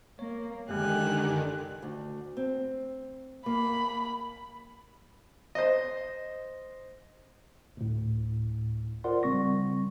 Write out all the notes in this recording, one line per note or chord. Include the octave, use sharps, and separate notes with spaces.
A#3 C#5
F#2 D3 D#3 G#3 G4 G#5 F#6
D2
C4
A#3 B5
C5 D#5
D2 A2
F4 A#4 C5 D5 F#5 C6
A#1 C#3 G3 C4 C#6 A#6